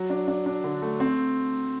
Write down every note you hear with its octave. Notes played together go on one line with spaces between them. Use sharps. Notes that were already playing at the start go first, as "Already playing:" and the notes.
Already playing: F#3
D4
D4
D4
D3
A3
C4